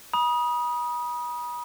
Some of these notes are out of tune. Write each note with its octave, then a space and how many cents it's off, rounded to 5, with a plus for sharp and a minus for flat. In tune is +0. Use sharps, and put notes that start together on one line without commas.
B5 -40 D#6 +0